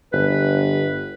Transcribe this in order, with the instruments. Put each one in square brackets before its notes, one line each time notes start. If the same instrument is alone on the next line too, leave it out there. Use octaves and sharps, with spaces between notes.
[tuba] G1 [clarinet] B4